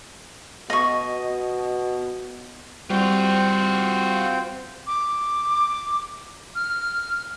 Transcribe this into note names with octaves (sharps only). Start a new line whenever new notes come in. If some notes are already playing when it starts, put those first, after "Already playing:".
B2 D#5 C#6
G3 C4 F4 F#4 G5
D6
F6